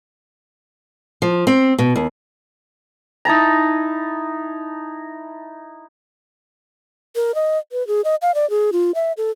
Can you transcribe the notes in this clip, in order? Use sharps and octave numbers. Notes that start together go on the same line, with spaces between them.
F3
C4
B2
D#2
D#4 E4 A5 A#5
A#4
D#5
B4
G#4
D#5
F5
D5
G#4
F4
E5
A4